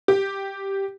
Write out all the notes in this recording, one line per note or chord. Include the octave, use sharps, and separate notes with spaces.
G4